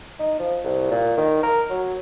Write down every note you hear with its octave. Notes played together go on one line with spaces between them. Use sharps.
D#4
F3
C2
A#2
D#3
A#4
F#3